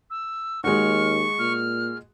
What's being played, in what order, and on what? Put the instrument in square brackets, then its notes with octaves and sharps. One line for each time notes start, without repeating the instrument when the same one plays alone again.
[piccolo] E6
[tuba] D#2 [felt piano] G#3 F#4 [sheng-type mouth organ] C#6 [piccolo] F6
[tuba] A#2 [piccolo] F6